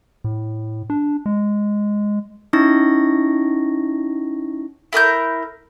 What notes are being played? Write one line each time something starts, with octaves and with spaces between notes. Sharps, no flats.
A2
D4
G#3
C#4 D#4 E4 C#6 A#6
E4 A#4 D#6 G6